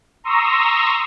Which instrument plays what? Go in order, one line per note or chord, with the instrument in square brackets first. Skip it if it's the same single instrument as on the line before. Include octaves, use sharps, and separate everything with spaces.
[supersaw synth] A#5 C6 C#6 D#6 E6 A#6